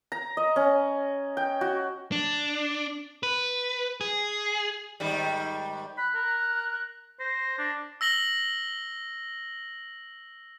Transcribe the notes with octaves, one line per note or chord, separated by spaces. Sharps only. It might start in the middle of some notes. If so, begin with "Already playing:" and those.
A#5
D#5
C#4
G5
F#4
D4
B4
G#4
G#2 D#3 G3
B5 F#6
A#4
C5 A#6
D4
E6 A#6 F#7 G7